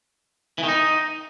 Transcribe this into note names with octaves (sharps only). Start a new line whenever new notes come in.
E3
D#3
D#4